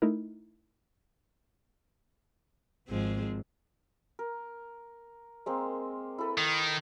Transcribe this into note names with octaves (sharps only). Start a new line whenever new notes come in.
A3 D#4 E4 A#4
G#1 F3 G#3 C4
A#4
G#3 A#3 C4
E4 A4 B4
D#3